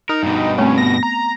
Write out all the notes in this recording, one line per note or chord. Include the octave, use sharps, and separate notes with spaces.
D#4 A#4
G2 B2
A3 C4 C#4
B3 A#6
A#5